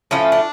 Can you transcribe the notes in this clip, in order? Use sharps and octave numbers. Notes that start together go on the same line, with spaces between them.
A2 F3 A3 C#4
D4